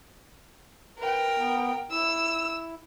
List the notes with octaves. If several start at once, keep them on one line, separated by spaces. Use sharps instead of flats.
A#4 B4 G5
B3
E4 E6